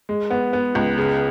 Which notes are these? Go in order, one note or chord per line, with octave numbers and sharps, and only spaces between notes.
G#3
B3
B3
C#2
C#3